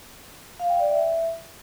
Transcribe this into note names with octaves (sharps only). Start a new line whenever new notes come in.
F5
G5
D5
E5